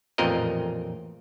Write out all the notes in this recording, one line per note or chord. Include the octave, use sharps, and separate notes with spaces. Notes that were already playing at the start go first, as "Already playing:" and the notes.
A1 F2 A#2 C4 A#4 D#5